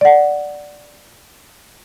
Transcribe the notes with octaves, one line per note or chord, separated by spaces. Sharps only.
D5 F#5